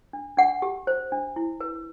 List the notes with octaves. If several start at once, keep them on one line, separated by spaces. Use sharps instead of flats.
D4
D4 F#5
G4
C5
D4
E4
B4